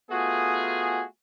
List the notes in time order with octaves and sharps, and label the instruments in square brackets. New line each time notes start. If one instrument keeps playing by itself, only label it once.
[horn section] A3 B3 F4 F#4 G#4